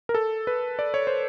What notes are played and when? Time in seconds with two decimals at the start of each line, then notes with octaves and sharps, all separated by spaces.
0.09 A#4
0.14 A4
0.47 B4
0.79 D5
0.94 C#5
1.07 C5